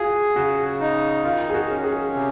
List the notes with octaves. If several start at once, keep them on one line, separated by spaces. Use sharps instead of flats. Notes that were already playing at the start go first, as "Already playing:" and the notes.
Already playing: F4 F#4 G#4
C#3 F#4
D#4
D#3 F4
G#4
F#4
C#4
G#4
C3